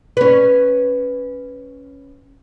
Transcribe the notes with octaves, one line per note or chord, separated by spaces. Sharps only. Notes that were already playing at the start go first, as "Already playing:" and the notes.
C#4 B4